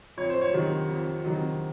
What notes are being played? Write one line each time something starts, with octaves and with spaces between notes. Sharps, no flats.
F2 C#5
C5
C#5
C3 D#3 F#3
F2
C3 D#3 F#3